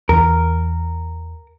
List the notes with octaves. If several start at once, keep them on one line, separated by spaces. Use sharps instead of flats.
E2 E3 A#4